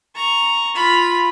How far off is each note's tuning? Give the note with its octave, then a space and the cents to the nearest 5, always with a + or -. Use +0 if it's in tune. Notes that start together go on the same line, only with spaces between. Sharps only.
A#5 +0 C#6 -5
F4 +0 B5 +0